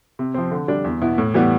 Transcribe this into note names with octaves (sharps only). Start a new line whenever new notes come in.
C3
F3 C4
D3
G3 D4
E2
B2 B3 E4
A2
E3 G3 B3